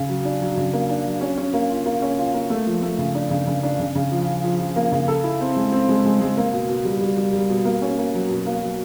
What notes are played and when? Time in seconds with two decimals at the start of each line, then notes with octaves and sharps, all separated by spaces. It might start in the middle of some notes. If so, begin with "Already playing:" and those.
Already playing: C#3
0.09 F#3
0.25 D4
0.41 F#3
0.57 C#3
0.73 A#3
0.89 D4
1.05 F#3
1.21 C#4
1.38 C#4
1.53 A#3
1.70 F4
1.86 A#3
2.02 C#4
2.18 F4
2.34 A#3
2.50 A3
2.67 F3
2.82 A3
2.98 C#3
3.15 D4
3.31 C#3
3.47 C#3
3.63 D4
3.79 C#3
3.95 C#3
4.12 F3
4.27 F3
4.44 F3
4.60 F3
4.76 A#3
4.92 C#3
5.08 A4
5.24 E4
5.40 C4
5.56 G#3
5.72 C4
5.89 G#3
6.05 G#3
6.21 G#3
6.37 A#3
6.53 B2
6.69 B2
6.85 G3
7.01 G3
7.17 G3
7.33 G3
7.49 B2
7.65 A#3
7.82 C#4
7.98 A#3
8.14 F#3
8.30 B2
8.46 A#3
8.63 F#3